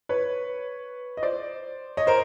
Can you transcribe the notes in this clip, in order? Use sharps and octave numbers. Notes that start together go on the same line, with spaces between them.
B4 C#5
D#5
C5 D5
C#5 D#5
A#4 C5